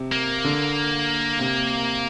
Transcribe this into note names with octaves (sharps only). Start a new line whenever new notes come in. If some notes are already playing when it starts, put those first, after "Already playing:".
Already playing: C3
A#3
D3
C3